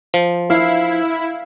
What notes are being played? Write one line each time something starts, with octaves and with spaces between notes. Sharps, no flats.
F3
E4 F5